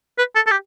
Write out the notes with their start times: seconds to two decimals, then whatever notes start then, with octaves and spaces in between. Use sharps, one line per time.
0.18 B4
0.35 A4
0.46 A4
0.51 G4